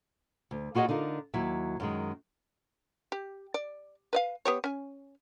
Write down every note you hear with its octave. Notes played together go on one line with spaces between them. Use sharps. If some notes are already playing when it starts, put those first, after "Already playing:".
D2
A#3 F4 F#4 G#4 D#5 F#5
D3 D#4 F4 A#4
D#2 F#3 E4 E5
F#2 D#3 G#3
G4
D5
B4 D#5 F5
B3 G4 C#5
C#4 G#5